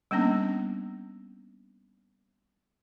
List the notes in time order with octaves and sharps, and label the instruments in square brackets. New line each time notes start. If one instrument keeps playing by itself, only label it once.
[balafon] G3 A#3 B3 C#4 D4